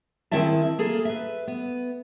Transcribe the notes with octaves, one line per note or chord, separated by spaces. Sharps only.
D#3 C4 E4 G#4 E5 A5
A#3 G#4 A4
B4 E5
B3